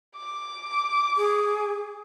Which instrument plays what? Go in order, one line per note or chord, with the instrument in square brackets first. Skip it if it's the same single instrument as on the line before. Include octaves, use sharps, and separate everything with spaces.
[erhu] D6
[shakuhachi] G#4